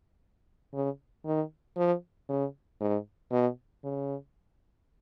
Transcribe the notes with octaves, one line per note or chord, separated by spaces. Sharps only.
C#3
D#3
F3
C#3
G#2
B2
C#3